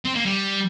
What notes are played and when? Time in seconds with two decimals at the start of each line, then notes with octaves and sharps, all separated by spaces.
0.05 C4
0.15 A#3
0.26 G3